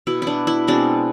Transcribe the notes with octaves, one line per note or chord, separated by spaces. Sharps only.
B2 B3 E4
D4 E4
E4
B2 G#3 C4 D4